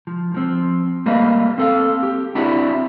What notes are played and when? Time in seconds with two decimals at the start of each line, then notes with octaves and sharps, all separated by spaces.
0.07 F3
0.34 F3 C4
1.06 G3 A3 A#3 B4 D#5 F5
1.58 C4 A4 F5
2.03 G4
2.35 C4 D4 E4 F#4 G4 D5